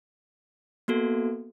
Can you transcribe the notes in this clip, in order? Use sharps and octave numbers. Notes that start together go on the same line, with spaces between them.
A#3 B3 F#4 A4